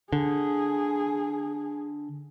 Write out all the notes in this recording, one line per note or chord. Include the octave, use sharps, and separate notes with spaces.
D3 G#4